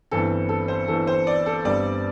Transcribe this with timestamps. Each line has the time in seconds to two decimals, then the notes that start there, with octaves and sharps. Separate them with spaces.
0.11 G1 G2 E3 C4 A4
0.49 A4
0.68 C5
0.88 G1 G2 E3 C4 A4
1.07 C5
1.27 D5
1.46 A4
1.64 G1 G2 G3 C4 D5